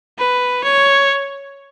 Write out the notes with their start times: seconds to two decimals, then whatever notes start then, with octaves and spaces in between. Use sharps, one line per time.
0.18 B4
0.64 C#5